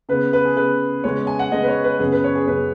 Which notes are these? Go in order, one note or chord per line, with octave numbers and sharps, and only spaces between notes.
C#3 B3 B4
B4
G#4
C#3 B3 B4
C#3 G#3 B3 C#5
G#5
F#5
C#3 G#3 B3 D#5
B4
C#5
B4
F#2 C#3 B3 G#4
B4
C#5
G#4
F#2 C#3 B3 B4